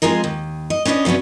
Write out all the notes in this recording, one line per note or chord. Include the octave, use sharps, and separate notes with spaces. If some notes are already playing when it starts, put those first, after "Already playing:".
F2 G#3 F4 G#4 A#4 D#5
D#2
D#5
C#4 D4 B4 C5 D#5
C3 F#3 B3 C#4 D4